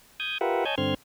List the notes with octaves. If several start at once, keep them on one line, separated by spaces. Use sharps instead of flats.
D#6 G6 G#6
F4 G4 A#4 B4 E5 F#5
C#5 D#5 G#5 A5 G6 G#6
G2 D3 C4 C6 F6 G#6